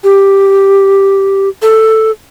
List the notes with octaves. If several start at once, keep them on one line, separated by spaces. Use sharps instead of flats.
G4
A4